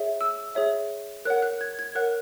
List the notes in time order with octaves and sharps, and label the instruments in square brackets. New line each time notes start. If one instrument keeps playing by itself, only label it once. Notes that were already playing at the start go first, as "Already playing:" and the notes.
Already playing: [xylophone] G#4 C#5 E5
E6
G#4 C#5 E5
A#4 C#5 F#5 F#6
F#6
G#6
G#6
A#4 C#5 F#5 F#6